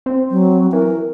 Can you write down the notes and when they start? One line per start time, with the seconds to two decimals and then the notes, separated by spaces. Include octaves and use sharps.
0.06 C4
0.31 F#3
0.73 E3 A#4